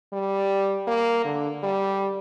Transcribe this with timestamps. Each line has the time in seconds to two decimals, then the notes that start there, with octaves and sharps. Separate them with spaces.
0.13 G3
0.88 A#3
1.25 D3
1.63 G3